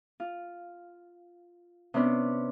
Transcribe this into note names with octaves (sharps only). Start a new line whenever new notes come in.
F4
C3 B3 C#4 D4